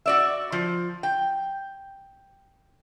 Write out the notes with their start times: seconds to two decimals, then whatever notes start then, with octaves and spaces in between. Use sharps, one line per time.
0.06 F#4 D5 E5
0.52 F3
1.03 G5